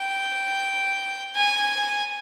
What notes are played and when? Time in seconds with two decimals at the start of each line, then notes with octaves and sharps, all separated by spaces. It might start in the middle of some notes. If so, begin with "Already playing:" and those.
Already playing: G5
1.36 G#5